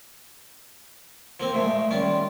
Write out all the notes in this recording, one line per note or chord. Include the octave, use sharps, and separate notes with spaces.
F3 A#3 C4
A#2 G#3 A3
A3
A3
D#3 G3 C#4 F4